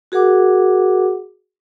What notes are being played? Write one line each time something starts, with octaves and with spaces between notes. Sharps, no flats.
F#4 G#4 A#4 F#5 D6